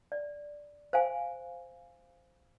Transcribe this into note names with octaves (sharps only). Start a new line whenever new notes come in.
D5
C5 F5 G#5